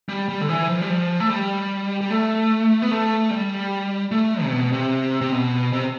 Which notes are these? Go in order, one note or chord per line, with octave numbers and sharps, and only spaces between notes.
G3
G3
D3
E3
F3
G3
F3
A3
G3
G3
A3
B3
A3
G3
A3
C3
B2
C3
C3
B2
C3